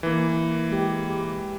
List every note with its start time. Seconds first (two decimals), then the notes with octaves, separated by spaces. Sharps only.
0.03 E3 A#3
0.71 G#3 G4